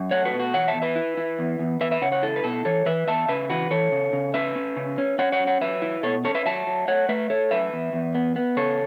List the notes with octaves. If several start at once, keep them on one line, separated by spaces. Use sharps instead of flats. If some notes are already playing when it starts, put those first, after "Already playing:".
Already playing: F#2
A3 C#5 F#5
F#4 B4
B2
F#4
E2 C#5 F#5
E5 A5
E2
B4 E5
E4
E4
E2
E2
E2 B4 E5
B4 E5
C#3 C#5 F#5
C#5 F#5
E4 A4
B4
B2 A4
E3 A4 C#5
E3 B4 E5
E2 E5 A5
C#3 B4 E5
E3 F#4 B4
E3 A4 C#5
C#3
C#3
C#4 B4 E5
C#4
C#3
C#4
C#4 C#5 F#5
C#5 F#5
F#3
C#5 F#5
F#3 B4 E5
E4
B2 A4 C#5
C#4 A4 C#5
B4 E5
F#3 E5 A5
F#3
A3 C#5 F#5
A3 B4 E5
A3 A4 C#5
F#2 B4 E5
E2
E2
B3
B3
C#3 A4 C#5